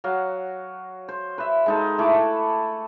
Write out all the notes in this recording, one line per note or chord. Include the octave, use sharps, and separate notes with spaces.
F#3 F5 F#5
C5
B4 E5
G#3 D#4 A4
A3 E4 D6